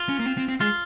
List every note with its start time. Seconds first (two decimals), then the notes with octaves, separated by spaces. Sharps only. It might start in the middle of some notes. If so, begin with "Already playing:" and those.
Already playing: F4
0.09 C#4
0.20 A#3
0.26 C4
0.37 C4
0.49 C4
0.60 G#3 F4